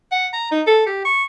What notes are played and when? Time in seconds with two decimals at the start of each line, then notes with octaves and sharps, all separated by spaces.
0.12 F#5
0.33 A#5
0.52 D#4
0.67 A4
0.87 G4
1.05 C#6